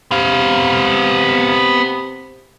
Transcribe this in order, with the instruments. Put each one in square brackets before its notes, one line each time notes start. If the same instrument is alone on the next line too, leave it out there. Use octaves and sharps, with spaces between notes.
[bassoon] C3 [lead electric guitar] B3 F5